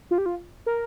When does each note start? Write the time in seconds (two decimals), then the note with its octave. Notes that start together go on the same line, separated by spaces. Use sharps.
0.11 F4
0.18 G4
0.26 F4
0.66 A#4